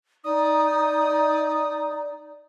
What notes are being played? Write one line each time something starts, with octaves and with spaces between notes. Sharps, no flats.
D#4 D5 D#6